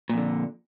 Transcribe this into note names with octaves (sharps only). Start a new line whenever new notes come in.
F2 A#2 D3